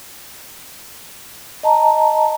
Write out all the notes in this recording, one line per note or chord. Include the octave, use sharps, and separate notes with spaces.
D#5 A5 A#5